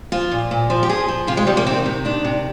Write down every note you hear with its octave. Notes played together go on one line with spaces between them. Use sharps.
F3 F4
A#2
A#2
F3
G4
F3 G#4
F3
C3 F4
G#3
F3 G3
A#3
D#3 C4
C3
D#3 D4
C3